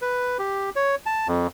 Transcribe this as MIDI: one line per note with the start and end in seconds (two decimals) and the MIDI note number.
0.02 0.38 71
0.39 0.70 67
0.76 0.95 73
1.06 1.28 81
1.28 1.47 41